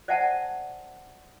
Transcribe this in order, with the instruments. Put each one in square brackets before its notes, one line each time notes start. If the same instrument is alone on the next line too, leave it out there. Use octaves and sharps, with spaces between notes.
[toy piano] C5 D5 E5 F#5 G#5 A5